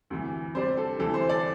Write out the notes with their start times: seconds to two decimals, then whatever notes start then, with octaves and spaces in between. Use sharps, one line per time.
0.10 D2 C3 E3
0.55 C3 G3 D4 C5
0.77 A4
0.99 D2 C3 E3 A4
1.14 C5
1.29 A4 D5